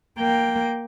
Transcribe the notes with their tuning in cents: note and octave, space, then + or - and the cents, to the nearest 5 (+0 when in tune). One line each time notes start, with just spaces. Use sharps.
A#3 +0 G5 +0